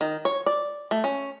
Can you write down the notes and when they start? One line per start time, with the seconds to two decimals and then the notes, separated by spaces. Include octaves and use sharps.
0.01 D#3
0.25 C#5
0.46 D5
0.91 A3
1.04 C#4